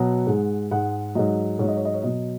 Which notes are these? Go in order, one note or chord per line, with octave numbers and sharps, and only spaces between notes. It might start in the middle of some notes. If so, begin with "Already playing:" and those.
Already playing: B2 F#3 F#5
G#2 G#3
G#2 G#3 F#5
G#2 F#3 D#5
G#2 F#3 C#5
D#5
C#5
D#5
C#5
B2 F#3 D#5